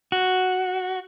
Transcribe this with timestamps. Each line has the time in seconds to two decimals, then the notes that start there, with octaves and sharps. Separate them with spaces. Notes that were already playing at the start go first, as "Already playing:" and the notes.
0.12 F#4